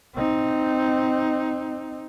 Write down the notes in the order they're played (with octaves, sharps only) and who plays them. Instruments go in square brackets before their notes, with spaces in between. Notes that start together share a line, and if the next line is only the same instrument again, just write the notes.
[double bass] C4 D#4